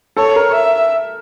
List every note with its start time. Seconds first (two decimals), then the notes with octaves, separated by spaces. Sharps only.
0.17 A4 C#5
0.36 A#4
0.55 E5